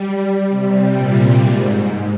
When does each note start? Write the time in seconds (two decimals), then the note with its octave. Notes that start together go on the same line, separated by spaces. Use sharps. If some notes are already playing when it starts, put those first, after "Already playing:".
Already playing: G3
0.50 C3
0.94 A#2
1.39 G#2